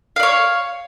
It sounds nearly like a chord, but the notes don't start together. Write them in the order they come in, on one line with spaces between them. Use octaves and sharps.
F5 D5 C#5